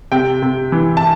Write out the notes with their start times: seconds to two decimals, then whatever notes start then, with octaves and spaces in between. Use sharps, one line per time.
0.12 C3 G5
0.42 C3
0.72 E3
0.97 A5